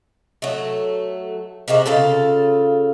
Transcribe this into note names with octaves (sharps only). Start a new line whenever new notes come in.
F#3 A3
C3 G#3 F#4 A#4
C#3 F4 A4